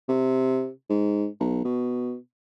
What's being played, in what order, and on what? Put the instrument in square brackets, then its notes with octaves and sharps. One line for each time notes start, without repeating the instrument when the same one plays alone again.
[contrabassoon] C3
G#2
B1
B2